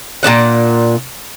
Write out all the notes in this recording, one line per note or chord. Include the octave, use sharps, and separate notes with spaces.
A#2 G#3 D4 F#5